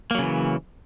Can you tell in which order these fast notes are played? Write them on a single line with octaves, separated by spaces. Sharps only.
A#3 F#3 C#3 E3